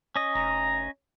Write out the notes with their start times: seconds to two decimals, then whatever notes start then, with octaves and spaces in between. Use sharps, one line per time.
0.16 C#4 D#5
0.35 F1 A#5